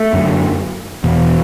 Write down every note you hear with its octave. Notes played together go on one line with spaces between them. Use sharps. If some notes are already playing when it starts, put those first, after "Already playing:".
Already playing: A3
F#2 D3
E2 B2